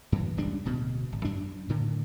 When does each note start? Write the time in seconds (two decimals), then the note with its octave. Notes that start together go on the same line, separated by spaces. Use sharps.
0.12 F#2 E3
0.37 D#1 C#2 G3 D4
0.65 D1 B2
1.12 G#1
1.25 F#2 D4
1.69 A2 D3 D#3